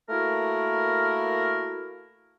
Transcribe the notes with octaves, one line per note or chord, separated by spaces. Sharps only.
A3 A#3 E4 F#4 A#4